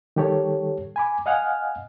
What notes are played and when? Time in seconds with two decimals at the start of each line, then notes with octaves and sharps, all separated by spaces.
0.16 D#3 G3 G4 A4 C#5
0.96 G#5 B5 D6
1.26 D#5 F5 F#5 G#5 F6